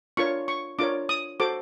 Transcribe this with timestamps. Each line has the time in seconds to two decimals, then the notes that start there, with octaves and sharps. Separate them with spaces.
0.17 D4 F4 A#4 C#5 C#6
0.48 C#6
0.79 D4 F4 A#4 C#5 D6
1.09 D#6
1.40 F#4 A4 C5 D6